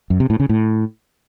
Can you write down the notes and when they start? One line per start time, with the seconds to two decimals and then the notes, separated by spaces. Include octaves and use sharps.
0.10 F#2
0.20 C3
0.30 A2
0.40 C#3
0.49 A2